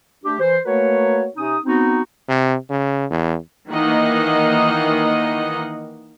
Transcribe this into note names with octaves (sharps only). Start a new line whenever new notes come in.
A3 D4 G4
E3 C5
A3 A#3 F#4 A#4 B4 C#5
C3 C#4 D#4 D#6
B3 C4 D#4 F#4
C3
C#3
E2
D#3 E3 A#3 D#4 D#5 F#5